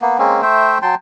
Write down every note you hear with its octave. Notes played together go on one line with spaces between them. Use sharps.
A#3 B3
G#3 A#3 C4 C#4
A3 C5 E5 G5
F#3 G5 A5 C6